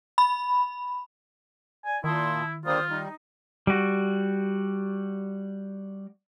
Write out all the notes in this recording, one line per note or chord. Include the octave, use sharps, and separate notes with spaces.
B5
D5 G#5
A#2 D#3 E4 A5 C6 D#6
D3 G3 A#3 F4 C5 D#6
G3 D#4
G3 F#4